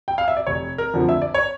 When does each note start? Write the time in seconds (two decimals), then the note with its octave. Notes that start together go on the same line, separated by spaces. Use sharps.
0.08 G5
0.18 F5
0.28 E5
0.37 D5
0.47 F1 C#5
0.78 A#4
0.94 F2 D3 F3 A3
1.09 E5
1.22 D5
1.34 C#5